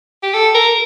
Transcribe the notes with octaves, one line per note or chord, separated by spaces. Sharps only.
G4
A4
A#4